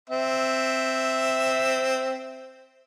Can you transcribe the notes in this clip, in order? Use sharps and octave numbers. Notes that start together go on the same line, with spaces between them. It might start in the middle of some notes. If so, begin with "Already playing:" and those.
C4 E5